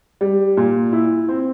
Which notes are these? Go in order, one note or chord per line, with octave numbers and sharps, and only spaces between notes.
G3
A#2
E4
C4